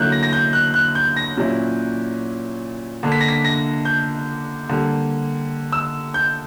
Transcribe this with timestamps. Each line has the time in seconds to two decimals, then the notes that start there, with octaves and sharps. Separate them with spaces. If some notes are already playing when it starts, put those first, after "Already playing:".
Already playing: D3 F#3 A#3 E4 F#6 G6
0.12 A#6
0.23 A#6
0.33 G6
0.53 F#6
0.74 F#6
0.95 G6
1.16 A#6
1.37 A#2 F#3 C#4 E4
3.03 D3 A#3 D4
3.12 B6
3.21 A#6
3.28 B6
3.45 A#6
3.85 G6
4.69 D3 G3 A#3
5.72 E6
6.14 G6